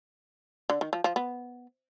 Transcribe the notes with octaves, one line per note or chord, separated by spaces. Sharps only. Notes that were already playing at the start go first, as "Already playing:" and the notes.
D3
D#3
F3
F3
B3